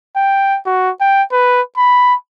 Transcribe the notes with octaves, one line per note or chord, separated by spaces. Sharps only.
G5
F#4
G5
B4
B5